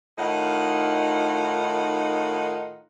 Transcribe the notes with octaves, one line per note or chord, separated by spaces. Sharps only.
A2 D#3 D#4 F4 F#5